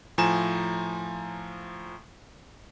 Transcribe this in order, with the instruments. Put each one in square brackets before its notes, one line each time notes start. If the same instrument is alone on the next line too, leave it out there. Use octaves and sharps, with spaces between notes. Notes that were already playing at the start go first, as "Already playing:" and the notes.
[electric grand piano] A2 F3 G#5 A#5 E7